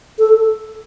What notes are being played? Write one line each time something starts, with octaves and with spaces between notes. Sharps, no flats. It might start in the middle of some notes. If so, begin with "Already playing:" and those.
A4